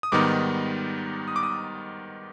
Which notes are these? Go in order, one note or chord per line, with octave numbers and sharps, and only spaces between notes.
D#6
G#2 D#3 G3 B3 D#4 D6
D#6
D6
D#6